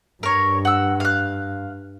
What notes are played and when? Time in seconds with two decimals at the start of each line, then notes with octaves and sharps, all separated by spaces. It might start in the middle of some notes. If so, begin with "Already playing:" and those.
0.23 G2 A#4 C#5
0.65 F#5 E6
1.00 F5 F#6